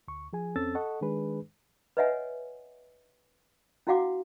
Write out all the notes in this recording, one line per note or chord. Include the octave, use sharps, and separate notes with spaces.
D2 C#6
F3 G#4 G#5
F2 C4 C#4 A4 E6 A6
A4 D#5 F#5 C#6
D#3 G#3 D4 G#4 B4
B4 C#5 D#5 E5 F#5 G#5
C#4 E4 F#4 F5 F#5 D6